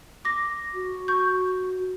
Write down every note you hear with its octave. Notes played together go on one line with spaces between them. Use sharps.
D6 A#6
F#4
C#6 G6